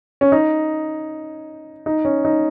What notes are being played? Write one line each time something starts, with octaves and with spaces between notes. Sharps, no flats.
C#4
D#4
D#4
C#4
D#4